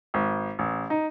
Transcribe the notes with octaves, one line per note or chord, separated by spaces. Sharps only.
G#1
A1
D#4